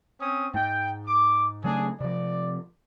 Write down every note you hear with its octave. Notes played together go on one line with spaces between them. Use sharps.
C4 C#4 D#6
G#2 G5
D6
C#3 F#3 A3 D4 G#4
C3 F3 D5